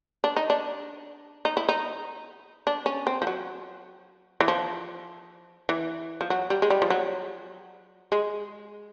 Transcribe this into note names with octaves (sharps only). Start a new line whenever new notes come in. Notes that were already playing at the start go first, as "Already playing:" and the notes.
D4
D#4
D4
D#4
E4
D#4
D4
C#4
C4
F3
F#3
E3
F3
E3
F3
F#3
G3
G#3
G3
F3
F#3
G#3